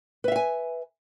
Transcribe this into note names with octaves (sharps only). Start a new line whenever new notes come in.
B4 E5 F5 G#5